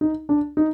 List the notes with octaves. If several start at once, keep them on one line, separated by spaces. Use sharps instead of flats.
D#4
D4
D#4